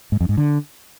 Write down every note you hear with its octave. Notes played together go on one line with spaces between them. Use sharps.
G#2
F2
G#2
D3